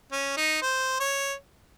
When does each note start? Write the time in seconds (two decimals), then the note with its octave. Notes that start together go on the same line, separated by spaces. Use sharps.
0.12 C#4
0.37 D#4
0.62 C5
1.00 C#5